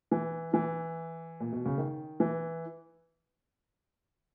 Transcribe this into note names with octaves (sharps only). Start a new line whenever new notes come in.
E3
E3
A#2
B2
C#3
D#3
E3